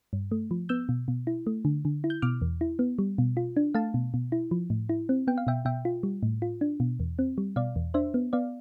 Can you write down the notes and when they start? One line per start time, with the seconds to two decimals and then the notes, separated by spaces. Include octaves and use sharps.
0.13 G2
0.32 A3
0.51 F3
0.69 B3 E6 G6
0.89 B2
1.08 B2
1.27 E4
1.47 A3
1.65 D3
1.85 D3
2.04 E4
2.10 G6
2.22 B2 D6 F6
2.42 E2
2.61 E4
2.79 B3
2.99 G3
3.18 B2
3.37 F4
3.57 D4
3.74 A3 F5 A5
3.94 B2
4.14 B2
4.32 E4
4.51 F3
4.70 A2
4.89 E4
5.09 C4
5.27 B3 G5
5.38 F5
5.47 B2 E5 G5
5.65 B2 E5 G5
5.85 F4
6.03 G3
6.23 A2
6.42 F4
6.61 D4
6.80 B2
7.00 E2
7.19 C4
7.38 G3
7.56 B2 D5 F5
7.76 E2
7.94 D4 C5 E5
8.14 B3
8.33 B3 D5 F5